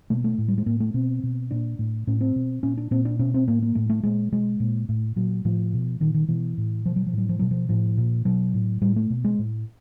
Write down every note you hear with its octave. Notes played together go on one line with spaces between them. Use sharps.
B2 A3
A#3
A3
A2
G3
G#3
A2 A#3
A3
B2 C4
B2
A#2 D4
A2
A2 C#4
C4
B2
A#2 C#4
D4
A#2 C4
D4
B2 C#4
C4
A2 A#3
A#3
A2 A3
A3
A#2 G#3
B2 G#3
A#2
A2 A3
A#2 F#3
A2 F3
B2
A#2 D#3
D#3
B2 E3
A2
B2 F3
F#3
F3
A2 F#3
F3
B2 F#3
F3
A2 F3
A#2
B2 F#3
A2
A2 G3
A3
B2
G#3
A2